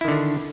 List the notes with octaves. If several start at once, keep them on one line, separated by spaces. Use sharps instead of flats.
D3 D#3 D4 E4